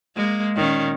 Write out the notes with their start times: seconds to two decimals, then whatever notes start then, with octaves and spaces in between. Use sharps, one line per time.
0.16 G#3 A#3
0.55 A#2 D#3 C#4